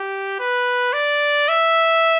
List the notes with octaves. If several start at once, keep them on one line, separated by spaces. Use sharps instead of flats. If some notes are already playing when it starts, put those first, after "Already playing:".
Already playing: G4
B4
D5
E5